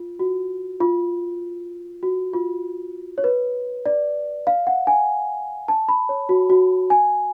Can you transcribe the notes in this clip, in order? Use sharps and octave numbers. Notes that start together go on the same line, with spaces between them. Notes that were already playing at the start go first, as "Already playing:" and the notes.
Already playing: F4
F#4
F4
F#4
F4
C#5
B4
D5
F5
F#5
G#5
A5
B5
C#5
F#4
F#4
G#5